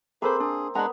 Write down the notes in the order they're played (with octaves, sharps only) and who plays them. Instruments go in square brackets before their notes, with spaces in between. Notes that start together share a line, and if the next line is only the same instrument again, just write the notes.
[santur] A#3 C4 C6 [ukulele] G#4 A4 C5 [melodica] B4 B5
[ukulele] D4 [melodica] G#4
[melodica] G#3 D4 F#5 [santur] B3 [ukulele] A#5 B5